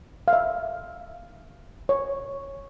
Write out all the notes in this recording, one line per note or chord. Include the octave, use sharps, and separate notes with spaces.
F5
E5
C#5